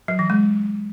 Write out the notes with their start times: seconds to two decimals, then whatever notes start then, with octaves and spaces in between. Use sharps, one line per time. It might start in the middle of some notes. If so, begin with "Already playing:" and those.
0.08 F#3
0.19 E3
0.30 G#3